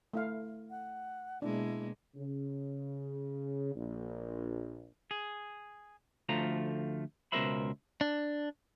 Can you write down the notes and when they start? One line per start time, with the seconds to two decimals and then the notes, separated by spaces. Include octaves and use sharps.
0.14 A3 E4 F5
0.70 F#5
1.42 B2 G#3 A#3 D4 E4
2.15 C#3
3.75 A#1
5.11 G#4
6.29 D2 F3 A3 F4 A#5
7.32 C#2 B2 A#4 C5 E5 B5
8.01 D4